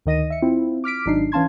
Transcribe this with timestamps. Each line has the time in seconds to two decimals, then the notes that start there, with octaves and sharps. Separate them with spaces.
0.06 D2 D#3 D#5 A#6 D#7
0.30 E5 C#7
0.42 C4 E4 F4
0.84 D6 F6 B6 D7
1.06 G#1 F#3 D4 D#4 C7
1.32 E3 C#4 F5 A5 C6 G#6